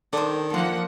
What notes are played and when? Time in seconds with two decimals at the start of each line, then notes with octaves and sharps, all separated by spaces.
0.13 D#3 D4 A4 C5
0.50 F3 A#3 A4 F#5 C6